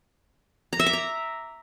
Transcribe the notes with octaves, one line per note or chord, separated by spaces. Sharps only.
A#5
E5
D6
A#5